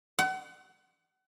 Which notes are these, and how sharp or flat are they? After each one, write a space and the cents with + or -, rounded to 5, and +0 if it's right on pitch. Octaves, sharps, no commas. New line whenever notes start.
F#5 +35